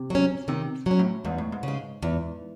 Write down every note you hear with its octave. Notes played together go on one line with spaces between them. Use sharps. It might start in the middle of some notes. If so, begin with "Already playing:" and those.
Already playing: C3
F#3 C#4
C3 D#3
F#3 C#4
A2
E2 G#2
A2
G#2
C#3 G#3
E2